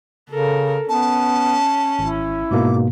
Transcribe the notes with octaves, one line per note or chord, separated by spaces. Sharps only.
C#3 A4 A#4
B3 C#4 A5
G#1 E4
G#2 B2 A#3 D6